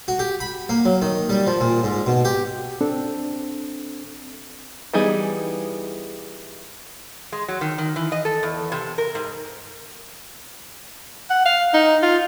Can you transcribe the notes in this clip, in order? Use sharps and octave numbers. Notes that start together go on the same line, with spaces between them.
F#4
G4
B5
A#3
F#3
D#3
G3
F3
A#2
G#2
B2
G4
C4 D4 A4
E3 G3 B3 D#4 G#4
G#3
F#3
D#3
D#3
E3
D#5
A4
E2
C3
A#4
G#2
F#5
F5
D#4
F4